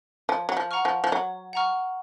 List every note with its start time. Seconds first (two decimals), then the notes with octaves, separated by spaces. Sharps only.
0.29 F3 C#5
0.49 F#3
0.57 F3
0.71 F#5 A#5 C#6 F6
0.85 F3
1.04 F3
1.12 F#3 C#5
1.53 F#5 A#5 C#6 F6